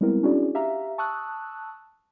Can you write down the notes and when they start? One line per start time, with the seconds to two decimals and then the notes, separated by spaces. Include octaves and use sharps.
0.01 G3 G#3 B3 C4 E4 A#4
0.23 C#4 D4 E4 F#4 G#4 D5
0.55 G4 E5 F5 A#5
0.98 A5 C#6 D#6 E6 F#6